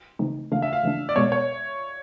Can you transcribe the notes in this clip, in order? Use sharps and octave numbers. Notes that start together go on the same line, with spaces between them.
C#3 E3 A3 C4 D#4
C#3 E3 A3 D4 F5
E5
F5
C#3 E3 A3 D4
D5
B2 G#3 B3 C#5
C#5